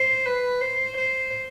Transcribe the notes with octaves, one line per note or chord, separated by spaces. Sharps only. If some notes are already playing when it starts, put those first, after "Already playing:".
Already playing: C5
B4
C5
C5